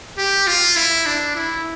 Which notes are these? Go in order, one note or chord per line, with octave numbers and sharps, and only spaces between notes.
G4
F4
E4
D4
E4